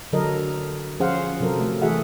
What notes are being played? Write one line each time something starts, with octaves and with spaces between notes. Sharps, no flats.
D3 F#3 A4 A#4 D#5
F3 C#4 G#4 C5 F5 F#5
C3 F#3 A4 A#4
A3
E3 A3 F#4 G#4 E5 F#5